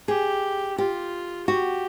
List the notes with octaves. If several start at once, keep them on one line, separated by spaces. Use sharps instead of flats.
G4 G#4
F4 G4
F#4 G4